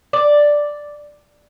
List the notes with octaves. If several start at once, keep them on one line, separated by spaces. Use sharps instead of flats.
D5